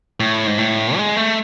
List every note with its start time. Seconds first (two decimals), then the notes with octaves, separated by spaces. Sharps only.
0.20 A2
0.47 G#2
0.58 A2
0.96 G#3
1.17 A3